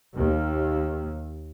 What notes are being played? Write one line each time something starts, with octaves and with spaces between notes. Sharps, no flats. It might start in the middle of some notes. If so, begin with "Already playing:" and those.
D#2